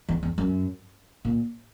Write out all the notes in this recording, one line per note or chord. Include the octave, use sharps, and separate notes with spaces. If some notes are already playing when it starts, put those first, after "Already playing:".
E2
E2
F#2
A#2